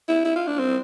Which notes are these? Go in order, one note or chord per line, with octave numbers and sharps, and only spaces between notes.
E4
E4
F4
D4
C4